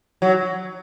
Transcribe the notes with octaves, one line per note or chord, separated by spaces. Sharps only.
F#3